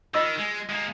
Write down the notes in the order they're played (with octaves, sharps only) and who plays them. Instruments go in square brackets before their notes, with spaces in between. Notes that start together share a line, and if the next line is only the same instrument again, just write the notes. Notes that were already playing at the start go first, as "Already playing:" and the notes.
[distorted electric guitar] D#3 [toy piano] F4 D#5 E6
[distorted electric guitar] G#3
G#3 A#3